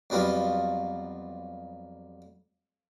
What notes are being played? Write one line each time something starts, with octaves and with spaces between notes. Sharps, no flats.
F2 F#3 G3 B3 F4